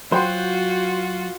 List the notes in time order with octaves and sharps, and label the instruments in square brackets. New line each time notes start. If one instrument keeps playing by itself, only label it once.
[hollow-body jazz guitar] F#3 [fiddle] F4 F#4 [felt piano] C5 G5 C6